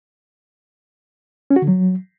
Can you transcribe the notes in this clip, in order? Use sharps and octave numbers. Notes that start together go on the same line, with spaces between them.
C#4
F#4
D3
F#3